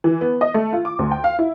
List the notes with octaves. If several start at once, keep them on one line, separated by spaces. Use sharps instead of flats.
E3
B3
D#5
A3
F4
D6
D2
G5
F5
E4